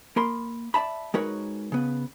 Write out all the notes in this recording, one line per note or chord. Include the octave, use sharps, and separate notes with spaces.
A#3 A#4 B5 C6
D5 E5 A5 B5
G#3 D#4 F#4 A#4 B4 C#5
C#3 B3